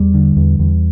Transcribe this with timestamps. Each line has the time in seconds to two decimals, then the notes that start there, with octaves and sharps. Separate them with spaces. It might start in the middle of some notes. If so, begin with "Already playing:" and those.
Already playing: E2 G3
0.14 D3
0.36 E2
0.59 E2